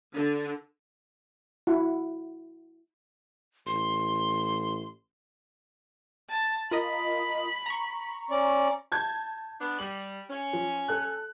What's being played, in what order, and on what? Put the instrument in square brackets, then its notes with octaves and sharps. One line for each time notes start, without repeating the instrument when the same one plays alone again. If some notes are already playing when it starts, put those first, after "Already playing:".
[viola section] D3
[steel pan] E4 F#4 F#5
[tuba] A1 [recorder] C6
[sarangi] A5
[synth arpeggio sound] F4 A#4 D#5 [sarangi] B5
[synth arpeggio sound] A#5 C#6
[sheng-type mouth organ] C#4 D5
[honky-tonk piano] A5 G6 G#6
[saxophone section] B3 D4
[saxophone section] G3 [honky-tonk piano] F#7
[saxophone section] C#4
[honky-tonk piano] F3
A4 F#6